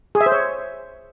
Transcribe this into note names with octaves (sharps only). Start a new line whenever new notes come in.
G#4
E5
C5
C#5